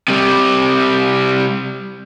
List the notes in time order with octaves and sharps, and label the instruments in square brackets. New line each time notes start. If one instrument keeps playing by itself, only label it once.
[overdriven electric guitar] C3 G3